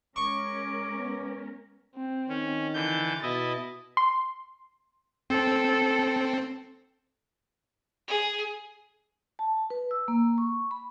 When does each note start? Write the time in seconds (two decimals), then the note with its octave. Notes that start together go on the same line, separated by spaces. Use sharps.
0.16 G#3 C#4 A#4 C#6 D6
0.98 B3
1.96 C4
2.29 D#3 C#4
2.74 D3 E3 G6 A6
3.23 B2 E4 D#5
3.97 C6
5.30 C4 A4
8.08 G#4
9.39 A5
9.70 B4
9.91 E6
10.08 A#3
10.38 C#6
10.71 B5